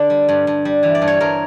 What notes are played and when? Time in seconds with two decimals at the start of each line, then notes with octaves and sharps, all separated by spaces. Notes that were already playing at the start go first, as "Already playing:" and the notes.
Already playing: D3 D4 D5
0.10 G3
0.29 G2
0.47 G2
0.65 G3
0.83 E3
0.95 D5
1.02 G2
1.07 C#5
1.20 G2 A#4